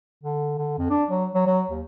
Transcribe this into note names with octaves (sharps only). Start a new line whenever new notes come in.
D3
D3
F2
D4
F#3
F#3
F#3
D#2